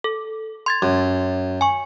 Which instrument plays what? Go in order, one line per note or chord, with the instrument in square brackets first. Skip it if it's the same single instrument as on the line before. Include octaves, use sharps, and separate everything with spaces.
[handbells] A4
C6 G#6 A6
[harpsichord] F#2
[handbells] G#5 C#6